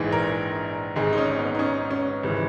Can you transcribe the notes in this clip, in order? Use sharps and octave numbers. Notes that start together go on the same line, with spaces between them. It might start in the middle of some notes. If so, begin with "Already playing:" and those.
Already playing: A#1 G#2 E3 G#4
A#4
G#1 G#2 D#3 G#4
D#4
C#4
B3
D#4
C#4
C#4
G#1 C#3 E3